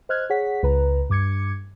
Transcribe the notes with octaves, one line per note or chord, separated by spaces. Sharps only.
C5 D#5 F6 F#6 G#6
G#4 C#5 F#5 B6
C#2 B4 A#5
G2 D6 G#6 C#7